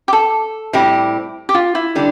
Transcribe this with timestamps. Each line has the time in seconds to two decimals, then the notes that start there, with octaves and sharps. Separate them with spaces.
0.08 G4
0.13 A4
0.73 A2 G3 C4 E4 G4
1.49 G4
1.55 F4
1.75 E4
1.95 D3 G3 D4